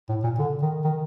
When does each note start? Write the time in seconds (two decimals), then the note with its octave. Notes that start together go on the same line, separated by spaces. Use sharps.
0.09 A2
0.23 A#2
0.39 D3
0.62 D#3
0.84 D#3